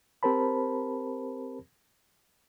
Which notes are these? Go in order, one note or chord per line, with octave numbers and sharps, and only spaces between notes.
C4 G4 A#4 C5 A5 B5